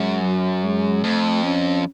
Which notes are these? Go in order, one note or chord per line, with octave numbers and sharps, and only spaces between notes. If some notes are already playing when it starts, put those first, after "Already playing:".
Already playing: F#2 G#3
F#3
G#3
F2 A3
C#4